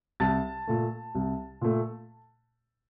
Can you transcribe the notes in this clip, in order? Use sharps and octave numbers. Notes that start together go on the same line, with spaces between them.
C2 A5 A6
A#2 A3
C2
A#2 A3